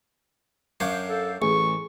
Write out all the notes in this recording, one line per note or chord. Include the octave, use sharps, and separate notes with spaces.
F#2 D4 C#5 F5 G6 C7
A4
A1 G#4 C#6